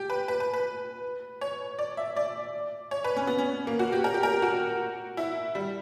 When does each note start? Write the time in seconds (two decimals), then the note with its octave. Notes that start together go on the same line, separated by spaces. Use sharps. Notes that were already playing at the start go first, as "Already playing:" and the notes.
Already playing: G4
0.10 B4
0.28 B4
0.40 B4
0.54 B4
1.41 C#5
1.79 D5
1.97 E5
2.16 D5
2.91 C#5
3.04 B4
3.16 C#4
3.27 B3
3.38 C#4
3.67 A#3
3.79 F#4
3.92 G4
4.04 A#4
4.14 G4
4.23 A#4
4.33 G4
4.42 F#4
5.17 E4
5.55 G3